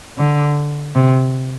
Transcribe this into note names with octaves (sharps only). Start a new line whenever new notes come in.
D3
C3